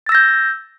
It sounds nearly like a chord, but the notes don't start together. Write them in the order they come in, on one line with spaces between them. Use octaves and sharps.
A6 E6 A#6 G6